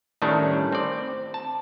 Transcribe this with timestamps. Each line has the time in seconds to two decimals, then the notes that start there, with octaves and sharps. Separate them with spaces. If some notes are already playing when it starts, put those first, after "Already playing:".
0.22 A2 D#3 G3 A3 C#4 D4
0.72 C4 D5
1.34 A5